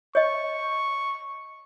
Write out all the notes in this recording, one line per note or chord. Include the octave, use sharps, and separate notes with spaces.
C#5 D#5 C#6